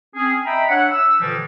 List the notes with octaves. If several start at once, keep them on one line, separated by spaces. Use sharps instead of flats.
C4 C#4 G#4
D#5 E5 G5 A#5 B5
D4 C#5 E5 F#5
E6
A#2 D3 E3 F3 G3 G#3